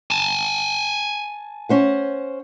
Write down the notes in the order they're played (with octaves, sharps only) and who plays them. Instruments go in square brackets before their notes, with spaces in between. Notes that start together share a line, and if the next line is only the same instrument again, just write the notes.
[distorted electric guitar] G#5 A5
[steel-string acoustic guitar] C#4 C5 F#5